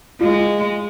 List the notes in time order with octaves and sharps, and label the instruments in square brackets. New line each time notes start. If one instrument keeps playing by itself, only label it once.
[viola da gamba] G#3 [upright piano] F4